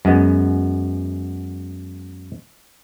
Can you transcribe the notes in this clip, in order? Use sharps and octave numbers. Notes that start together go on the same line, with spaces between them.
F#2 G#3 B3